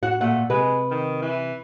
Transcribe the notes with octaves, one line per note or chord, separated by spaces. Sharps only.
A2 F#4 F#5
A#2 A3 F#5
C3 G#3 B4
D#3
E3